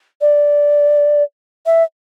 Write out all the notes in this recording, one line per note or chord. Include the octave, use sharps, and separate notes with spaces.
D5
E5